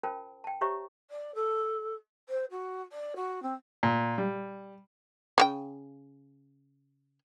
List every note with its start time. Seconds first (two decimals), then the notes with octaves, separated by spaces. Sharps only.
0.03 C#4 F4 A#4 C5 G5 A5
0.44 G5 A5
0.61 G4 C5 C#5 E5 A#5 C#6
1.11 D5
1.35 A4
2.29 C5
2.51 F#4
2.92 D5
3.16 F#4
3.42 C4
3.83 A#2
4.18 G3
5.38 C#3 F#4 G5